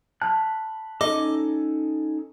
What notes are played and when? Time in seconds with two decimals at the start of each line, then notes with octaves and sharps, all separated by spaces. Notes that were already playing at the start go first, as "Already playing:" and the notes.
0.22 A5 B5 F6 F#6
1.01 C#4 D#4 A4 D#5 D6